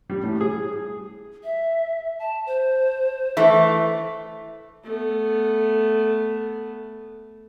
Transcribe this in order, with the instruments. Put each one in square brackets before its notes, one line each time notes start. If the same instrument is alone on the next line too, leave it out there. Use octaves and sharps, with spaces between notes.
[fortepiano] G3
A2
G#4
[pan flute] E5
A5
C5
[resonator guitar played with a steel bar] E3 A3
[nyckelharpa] A3 B3